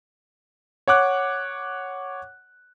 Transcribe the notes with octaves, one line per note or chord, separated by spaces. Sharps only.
C#5 F#5 D6 F#6